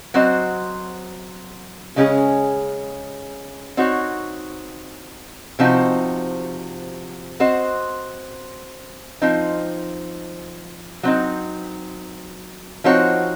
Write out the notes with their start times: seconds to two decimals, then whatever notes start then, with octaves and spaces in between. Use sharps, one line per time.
0.14 F#3 C4 F#4 C5 D#5
1.96 C#3 G#3 C#4 G#4
3.77 C4 D#4 F#4 C#5
5.59 C3 F3 C4 D#4 F#4
7.40 C4 F#4 C5 D#5
9.22 F3 C4 D#4
11.03 F#3 C4 D#4
12.84 F3 C4 D#4 F#4 C#5